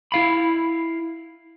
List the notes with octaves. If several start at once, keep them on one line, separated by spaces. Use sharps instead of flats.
E4 F5 B5